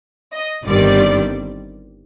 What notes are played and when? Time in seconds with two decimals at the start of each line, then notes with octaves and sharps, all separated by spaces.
0.33 D#5
0.65 G1 G2 D#3 G3 C4 D5